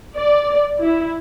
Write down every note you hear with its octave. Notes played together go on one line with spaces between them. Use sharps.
D5
E4